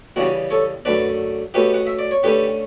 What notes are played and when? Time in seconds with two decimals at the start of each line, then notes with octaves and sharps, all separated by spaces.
0.16 E2 C#3 G3 D4 F#4
0.50 A4 C#5
0.85 F#2 D3 A3 D4 B4 D5
1.54 B2 A3 C#4 G4 B4
1.74 F#5
1.87 E5
1.99 D5
2.11 C#5
2.23 D3 A3 C#4 G4 B4